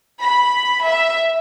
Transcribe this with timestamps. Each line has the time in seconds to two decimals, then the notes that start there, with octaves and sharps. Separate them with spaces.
0.22 B5
0.87 E5